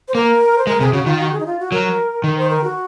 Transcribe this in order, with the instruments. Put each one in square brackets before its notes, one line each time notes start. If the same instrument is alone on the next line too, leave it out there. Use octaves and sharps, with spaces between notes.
[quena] C5
[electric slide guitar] A#3 [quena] A#4
[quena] C5
[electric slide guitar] G#3 [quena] A#4
[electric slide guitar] C3 [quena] G#4
[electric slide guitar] C#3 [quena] F#4
[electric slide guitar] D#3 [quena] F4
[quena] F#4
G#4
D#4
F4
F#4
[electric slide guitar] F#3 [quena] A#4
[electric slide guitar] D#3 [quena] A#4
[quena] C5
A#4
F#4